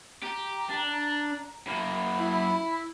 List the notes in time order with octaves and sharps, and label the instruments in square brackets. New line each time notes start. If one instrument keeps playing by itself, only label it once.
[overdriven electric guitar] G4 [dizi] A#5
[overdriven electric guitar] D4
[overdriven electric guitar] F#2 A#3 [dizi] B5
[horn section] E4